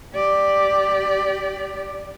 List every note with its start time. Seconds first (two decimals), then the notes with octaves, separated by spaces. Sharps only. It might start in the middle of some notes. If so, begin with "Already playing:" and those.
0.14 G4 D5